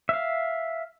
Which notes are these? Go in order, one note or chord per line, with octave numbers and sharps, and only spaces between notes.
E5 F5